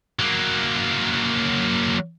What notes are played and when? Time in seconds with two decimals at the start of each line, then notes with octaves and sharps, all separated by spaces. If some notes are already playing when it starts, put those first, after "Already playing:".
0.19 F#3 A#3